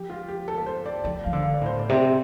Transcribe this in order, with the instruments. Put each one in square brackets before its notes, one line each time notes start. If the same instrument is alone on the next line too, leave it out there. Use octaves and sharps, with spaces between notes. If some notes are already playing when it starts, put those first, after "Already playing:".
Already playing: [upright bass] F3 [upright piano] G4
[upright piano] F4
G4
A4
A4
C5
D5
[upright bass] F3 [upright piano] D5
[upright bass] F3 [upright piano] F5
[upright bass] D3
[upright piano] F5
D5
[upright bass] A2 [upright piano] C5
[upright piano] D5
[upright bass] C3